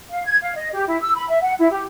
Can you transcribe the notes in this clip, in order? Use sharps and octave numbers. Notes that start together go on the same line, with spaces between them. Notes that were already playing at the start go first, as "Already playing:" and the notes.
F5
G#6
F5
D#5
G4
E4
E6
B5
E5
F#5
E4
G4